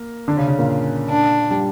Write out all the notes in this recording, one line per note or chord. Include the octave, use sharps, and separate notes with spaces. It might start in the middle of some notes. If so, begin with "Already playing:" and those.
Already playing: A#3 A#4
D3 D4
C#3 C#4
C#3 C#4
A#2 A#3
D4
G3